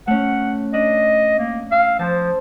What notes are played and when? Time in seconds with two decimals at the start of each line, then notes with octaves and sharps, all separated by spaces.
0.07 A3 C#4 F#5
0.73 D4 D#5
1.39 A#3
1.72 F5 E6
1.99 F3 C5 A5